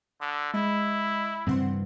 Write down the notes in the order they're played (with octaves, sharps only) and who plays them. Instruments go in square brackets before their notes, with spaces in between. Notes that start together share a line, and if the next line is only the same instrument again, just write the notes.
[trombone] D3 [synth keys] D#6
[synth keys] G#3 D#5 [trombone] E4
[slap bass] G2 C#3 E3 [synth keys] C4 F#5 C6